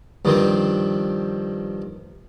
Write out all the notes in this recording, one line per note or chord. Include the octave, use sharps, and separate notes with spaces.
G2 D#3 F3 C4